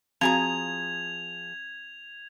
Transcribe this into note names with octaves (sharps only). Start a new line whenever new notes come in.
F3 C4 F#4 G#4 F5 A#5 G#6 F7